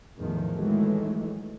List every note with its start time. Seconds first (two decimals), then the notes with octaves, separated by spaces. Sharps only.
0.18 E2 A2 D#3 F3
0.54 D#3 E3 F#3 G#3 A3